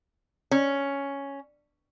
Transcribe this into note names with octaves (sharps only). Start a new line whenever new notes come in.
C#4